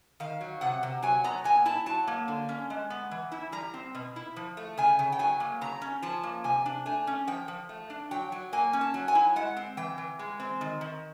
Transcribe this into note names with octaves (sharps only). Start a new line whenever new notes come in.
D#3 F5
F#3
C3 F#5
C3
F#3 G#5
B3 A#5
A#2 G#5
E4 A5
F#3 A5
A#3
D3
C#4
G#3
B3
E3
E4
G3 A#5
C4
B2
E4
F3
A3
C#3 G#5
C#3
G5
F#3 G#5
A#3
C#3 A#5
C#4
F3 A5
A#3
C3 G#5
D4
A3 G#5
C#4
F3 G5
F3
A3
D4
F#3 G5
F#3
A#3 G#5
C#4
A5
F#3
G#5
E4
G#3 F#5
C4
E3 G5
E3
G#3
C4
D#3
D#3